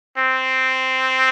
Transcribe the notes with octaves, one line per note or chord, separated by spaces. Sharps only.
C4